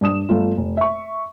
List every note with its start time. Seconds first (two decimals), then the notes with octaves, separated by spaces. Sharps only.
0.01 G2 D4 D#6 E7
0.29 G1 A3 F4
0.57 F1
0.77 E5 C#6